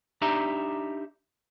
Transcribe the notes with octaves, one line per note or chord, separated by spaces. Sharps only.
D4 D#4 G4 E5 A#5